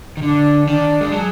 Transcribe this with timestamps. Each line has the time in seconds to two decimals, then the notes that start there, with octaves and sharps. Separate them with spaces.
0.17 D#3
0.22 D3 D4
0.67 D#3 D4
1.01 G#3
1.12 F#3 G#4